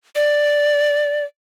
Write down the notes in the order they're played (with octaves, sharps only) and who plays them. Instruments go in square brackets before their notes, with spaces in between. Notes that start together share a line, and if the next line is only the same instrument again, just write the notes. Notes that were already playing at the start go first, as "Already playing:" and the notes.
[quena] D5